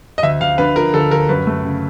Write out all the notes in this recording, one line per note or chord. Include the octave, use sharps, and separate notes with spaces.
D#5
D2 E5
D2 F5
D3 B4
F3 A#4
D2 A4
D2 A#4
F#2 B4
A3
C#3